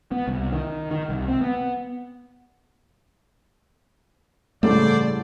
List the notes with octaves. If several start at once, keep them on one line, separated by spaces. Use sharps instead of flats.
B3
C2
D#3
D#3
C2
C4
B3
A1 G2 C#3 A3 A4 C5 D5